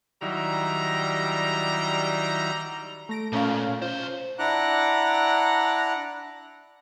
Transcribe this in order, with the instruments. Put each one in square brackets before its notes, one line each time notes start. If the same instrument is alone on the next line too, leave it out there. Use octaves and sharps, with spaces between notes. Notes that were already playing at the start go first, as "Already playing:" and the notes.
[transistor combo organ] D#3 F#3 E4 [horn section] G3 A#5
[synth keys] A3 A#6 D7
[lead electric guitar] A#2 [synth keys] A3 C#4 F5
[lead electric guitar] B1 C5 [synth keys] F4
[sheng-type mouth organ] D4 E4 F#5 A#5 D6 F#6